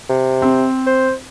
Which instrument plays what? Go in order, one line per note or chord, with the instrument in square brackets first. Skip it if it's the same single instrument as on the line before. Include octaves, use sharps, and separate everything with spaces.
[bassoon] C3
[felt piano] C4
[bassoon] C5